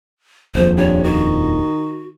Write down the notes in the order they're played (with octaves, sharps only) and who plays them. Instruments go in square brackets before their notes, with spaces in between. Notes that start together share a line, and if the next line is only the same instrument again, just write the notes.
[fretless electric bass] D#1 A#1 F2 [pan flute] C5
[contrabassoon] G2 [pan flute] C#5
[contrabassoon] D#3 [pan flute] F#4